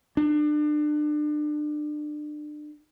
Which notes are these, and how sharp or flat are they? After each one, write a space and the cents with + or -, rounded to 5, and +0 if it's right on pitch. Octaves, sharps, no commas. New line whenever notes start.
D4 +30